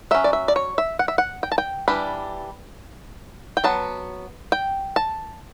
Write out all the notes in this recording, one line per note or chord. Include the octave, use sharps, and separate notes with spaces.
F#3 C#4 E5
D5
E5
D5
C#5
E5
F#5
E5
F#5
G5
A5
G5
E3 G3 D4 B5
G5
F#3 B3 A5
G5
A5